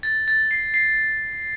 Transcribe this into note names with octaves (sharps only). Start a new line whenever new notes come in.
A6
A6
C7
C7